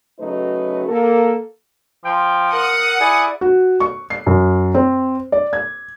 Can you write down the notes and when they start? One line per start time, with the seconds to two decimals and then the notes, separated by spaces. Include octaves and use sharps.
0.20 C#3 F#3 A3 D#4 F#4 B4
0.89 A#3 A4
2.05 F3 G5
2.52 A#4 F#5 D#6
3.00 E4 G#4 D5
3.41 F#4
3.80 C#6
4.10 C7
4.26 F#2
4.74 C4
5.32 D5
5.53 G#6